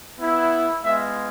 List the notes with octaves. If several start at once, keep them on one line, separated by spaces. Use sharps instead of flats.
B3 E4
G#3 B3 F4 E5